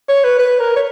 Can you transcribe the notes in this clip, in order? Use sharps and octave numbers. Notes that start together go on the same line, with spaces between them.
C#5
B4
B4
A#4
C#5